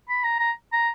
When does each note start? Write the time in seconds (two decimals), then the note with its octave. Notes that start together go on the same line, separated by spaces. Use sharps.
0.08 B5
0.23 A#5
0.39 A#5
0.72 A#5